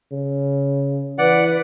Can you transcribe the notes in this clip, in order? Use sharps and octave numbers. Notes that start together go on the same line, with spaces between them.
C#3
E3 B4 D5 F#5